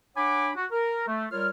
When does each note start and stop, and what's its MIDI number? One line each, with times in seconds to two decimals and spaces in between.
0.17 0.49 62
0.17 0.49 73
0.17 0.49 78
0.17 0.49 80
0.17 0.49 83
0.17 0.49 86
0.56 0.66 66
0.72 1.03 70
1.08 1.25 57
1.31 1.50 55
1.31 1.50 65
1.31 1.50 70
1.31 1.50 73
1.31 1.50 89